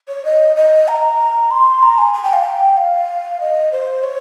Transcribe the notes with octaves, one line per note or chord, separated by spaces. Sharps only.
C#5
D#5
D#5
A#5
C6
A#5
G#5
G#5
G5
F5
G5
F5
D#5
C5
C#5